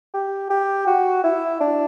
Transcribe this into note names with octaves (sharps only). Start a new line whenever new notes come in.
G4
G4
F#4
E4
D4